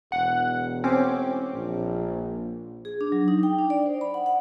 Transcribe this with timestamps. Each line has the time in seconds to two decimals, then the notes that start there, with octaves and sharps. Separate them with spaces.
0.12 E1 F#5
0.84 C4 C#4 D6
1.53 A#1
2.85 G#4
3.01 D4
3.12 F#3
3.28 D#4
3.43 G5
3.59 D4
3.70 D5
3.86 C5
4.01 B5
4.14 F#5
4.26 F#5